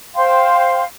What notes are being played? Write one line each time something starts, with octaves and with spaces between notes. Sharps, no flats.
C5 F5 G5 C6